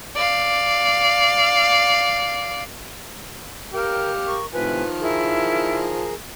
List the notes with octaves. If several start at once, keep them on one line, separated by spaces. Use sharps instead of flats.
D5 F5
G4 A#4 F5 G5
A#4 C#6
A2 C3 D#3 F3 B4 G#5
E4 G#4 A#4